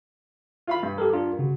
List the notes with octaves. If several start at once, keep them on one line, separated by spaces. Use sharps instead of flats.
F4 F5 B5
G2
G4 A4 A#4
D4 F4 A#4
C#3 F#4